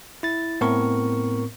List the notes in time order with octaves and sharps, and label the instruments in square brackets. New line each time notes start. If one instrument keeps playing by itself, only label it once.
[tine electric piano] E4 A6
A2 B3 C4 A#4 C#6